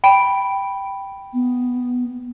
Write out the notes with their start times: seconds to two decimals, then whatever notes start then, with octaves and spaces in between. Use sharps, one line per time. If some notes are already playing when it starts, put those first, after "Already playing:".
0.04 G5 B5 D7
1.34 B3